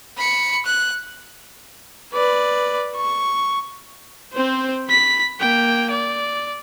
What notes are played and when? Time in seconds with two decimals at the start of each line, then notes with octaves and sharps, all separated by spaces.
0.17 B5 C#7
0.66 F#6
2.13 B4 D5
2.96 C#6
4.33 C4 C5
4.89 B5 B6
5.40 A#3 G5
5.91 D5